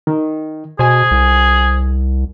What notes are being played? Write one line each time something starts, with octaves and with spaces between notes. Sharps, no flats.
D#3
B2 G#4 C5 G#5
C2